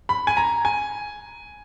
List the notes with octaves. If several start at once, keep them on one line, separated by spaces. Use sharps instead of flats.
B5
G#5
A#5
G#5